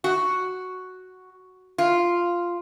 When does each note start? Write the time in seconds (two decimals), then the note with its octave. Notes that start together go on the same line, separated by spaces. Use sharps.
0.04 F#4
1.78 F4